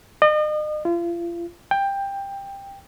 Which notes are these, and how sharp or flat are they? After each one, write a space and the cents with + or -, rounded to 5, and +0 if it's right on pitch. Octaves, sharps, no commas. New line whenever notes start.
D#5 -40
F4 -35
G5 +15